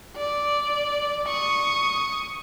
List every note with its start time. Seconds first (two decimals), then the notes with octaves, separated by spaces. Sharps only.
0.17 D5
1.28 C#6 D#6